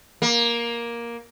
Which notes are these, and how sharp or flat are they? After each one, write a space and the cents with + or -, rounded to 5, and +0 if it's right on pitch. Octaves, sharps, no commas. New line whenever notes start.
A#3 +10